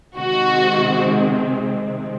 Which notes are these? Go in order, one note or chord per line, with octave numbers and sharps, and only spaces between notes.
C3 D#3 G#3 C4 F#4